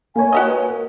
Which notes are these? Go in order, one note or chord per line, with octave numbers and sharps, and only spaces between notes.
A#3 C#5 G#5
F#4 G4 D#5
B4
A#4